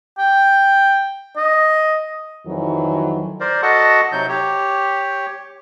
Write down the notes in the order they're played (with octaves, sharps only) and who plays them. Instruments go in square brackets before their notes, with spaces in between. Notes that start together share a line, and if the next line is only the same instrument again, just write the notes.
[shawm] G5
D#5
[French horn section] F2 D#3 E3 F#3
[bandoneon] A#4 C5 D5
F#4 A4 D#5 F#5 A5
C3 F#3 D#4 G6
G4 C#5